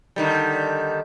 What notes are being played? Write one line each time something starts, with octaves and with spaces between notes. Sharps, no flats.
D3 D#3 G3